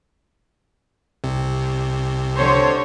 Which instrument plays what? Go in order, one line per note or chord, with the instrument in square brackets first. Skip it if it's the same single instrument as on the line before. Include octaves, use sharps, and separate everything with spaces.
[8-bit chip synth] C2 C3
[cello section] D3 C5 C#5